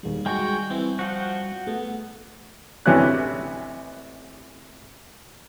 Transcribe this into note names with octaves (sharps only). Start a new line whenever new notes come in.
D#2 G3 G#3
G#3 F#4 G5 G#5 C#6
E3 C4
F3 F#4 F#5 G5
A3 B3
A1 C3 E3 C#4 D4 F#6